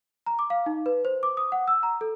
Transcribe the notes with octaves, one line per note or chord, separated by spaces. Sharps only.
A#5
D6
F5
D#4
B4
C5
D6
D#6
F#5
E6
A#5
A4